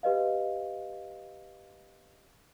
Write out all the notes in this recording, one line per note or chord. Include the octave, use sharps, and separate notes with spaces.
G4 B4 D#5 F5